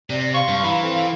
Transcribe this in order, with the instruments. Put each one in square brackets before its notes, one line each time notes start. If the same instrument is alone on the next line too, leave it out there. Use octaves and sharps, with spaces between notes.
[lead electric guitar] C3 [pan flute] D5
[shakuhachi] F5 [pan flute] C6 [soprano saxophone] C#6
[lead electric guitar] G2
[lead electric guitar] E3 [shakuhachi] F5 [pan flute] A#5 [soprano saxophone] B5
[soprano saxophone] C4 [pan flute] A4